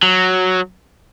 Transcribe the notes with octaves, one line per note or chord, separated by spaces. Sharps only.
F#3